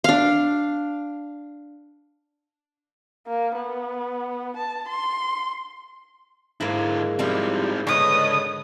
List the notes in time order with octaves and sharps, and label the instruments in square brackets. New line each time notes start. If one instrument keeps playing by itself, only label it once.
[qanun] D4 F5
[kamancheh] A#3
B3
A5
C6
[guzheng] G#2 A#3 [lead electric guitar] D3 E4
[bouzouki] F3 G3 E4 [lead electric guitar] C4 D#4
[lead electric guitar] C#2 D#5 [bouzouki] D3 B4 C#5 [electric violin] D#6